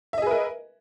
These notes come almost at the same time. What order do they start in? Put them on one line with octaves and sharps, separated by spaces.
E5 D#5 G#4 B4 A#4